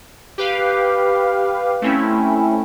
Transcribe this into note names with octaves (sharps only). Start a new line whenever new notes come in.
G4 B4 F5
A3 C4 C#4 E4